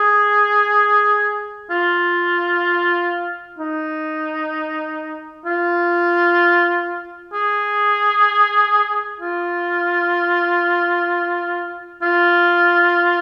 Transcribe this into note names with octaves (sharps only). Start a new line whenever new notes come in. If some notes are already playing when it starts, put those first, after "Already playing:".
Already playing: G#4
F4
D#4
F4
G#4
F4
F4